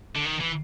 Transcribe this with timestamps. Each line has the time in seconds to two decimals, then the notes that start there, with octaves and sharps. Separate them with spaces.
0.16 D3
0.26 D#3
0.41 E3